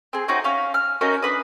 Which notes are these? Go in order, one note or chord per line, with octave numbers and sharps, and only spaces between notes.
C4 G#4
C4 C#4 D#4 F#4
C#4 F5
F6
C#4 D#4 F#4 A#4
D4 B4 D#6